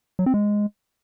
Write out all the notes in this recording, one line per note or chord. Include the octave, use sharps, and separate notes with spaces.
F#3
C4
G#3